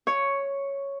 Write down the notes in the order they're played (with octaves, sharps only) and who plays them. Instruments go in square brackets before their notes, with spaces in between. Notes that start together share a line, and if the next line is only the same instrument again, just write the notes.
[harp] C#5